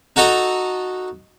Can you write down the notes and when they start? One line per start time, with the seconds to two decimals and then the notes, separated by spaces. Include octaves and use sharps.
0.16 D#4 F#4 A4 D#5 A#5